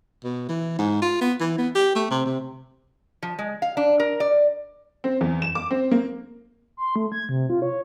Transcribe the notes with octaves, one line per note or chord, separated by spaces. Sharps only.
B2
E3
G#2
F4
B3
E3
B3
G4
A3
C3
C3
F3
G#3
F5
D4
A#4
D5
C4
E2
E7
D6
C4
A#3
C6
A3
G#6
C3
F4
C#5